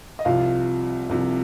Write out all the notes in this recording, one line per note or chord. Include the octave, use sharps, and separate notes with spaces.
D#5
C2 C3 F3 F4 F5
C2 C3 F3